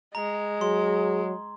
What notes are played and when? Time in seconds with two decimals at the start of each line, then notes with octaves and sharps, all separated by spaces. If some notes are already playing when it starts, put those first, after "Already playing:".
0.15 G#3 A#5
0.61 F#3 G#4 C6